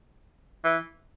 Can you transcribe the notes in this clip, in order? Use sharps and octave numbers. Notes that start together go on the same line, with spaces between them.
E3